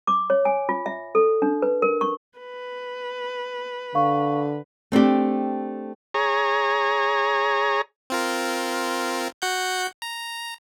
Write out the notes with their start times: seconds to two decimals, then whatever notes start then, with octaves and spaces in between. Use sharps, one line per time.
0.07 D6
0.30 C#5
0.45 G#5
0.69 F4
0.86 E5
1.15 A4
1.42 D4
1.62 B4
1.82 A#4
2.01 C#6
2.39 B4
3.95 D3 F5 C#6
4.92 A3 C4 D4 G4
6.14 G#4 C#5 A#5
8.10 C4 F4 A#4
9.42 F#4 F#5 G6
10.02 A#5